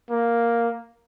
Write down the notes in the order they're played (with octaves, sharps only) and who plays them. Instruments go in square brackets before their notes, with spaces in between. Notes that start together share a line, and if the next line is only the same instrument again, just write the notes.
[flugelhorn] A#3